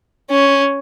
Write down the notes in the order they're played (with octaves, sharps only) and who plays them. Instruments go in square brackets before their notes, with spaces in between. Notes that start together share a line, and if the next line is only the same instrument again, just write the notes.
[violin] C#4